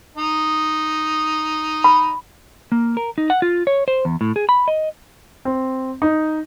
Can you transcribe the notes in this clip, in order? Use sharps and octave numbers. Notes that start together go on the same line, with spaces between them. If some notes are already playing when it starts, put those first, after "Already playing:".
D#4
B5
A#3
A#4
D#4
F#5
F4
C#5
C5
E2
A2
G#4
B5
D#5
C4
D#4